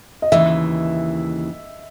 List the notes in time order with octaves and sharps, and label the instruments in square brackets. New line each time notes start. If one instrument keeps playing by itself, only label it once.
[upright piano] D#5
[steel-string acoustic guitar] D#2 C#3 E3 [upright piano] E5